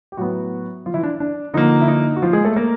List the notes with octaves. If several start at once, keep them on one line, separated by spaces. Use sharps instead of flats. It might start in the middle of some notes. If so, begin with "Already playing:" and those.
G4
A2 F#3 B3 F#4
F3 F4
E3 E4
D4
D4
D3 F3 A#3 D#4
E4
D#4
F#4
F3 F4
G#3 G#4
A3 A4
A#3 A#4